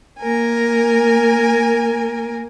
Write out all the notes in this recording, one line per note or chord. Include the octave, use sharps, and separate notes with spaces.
A#3 A#4 G#5